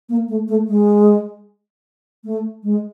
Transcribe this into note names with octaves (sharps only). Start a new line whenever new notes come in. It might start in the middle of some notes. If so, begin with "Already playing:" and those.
A#3
A3
A3
G#3
A3
G#3